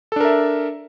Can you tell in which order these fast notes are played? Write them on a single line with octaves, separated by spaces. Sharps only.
A4 D4 A#4 E5